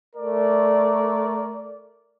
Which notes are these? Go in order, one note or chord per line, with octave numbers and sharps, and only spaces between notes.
A3 A#4 D5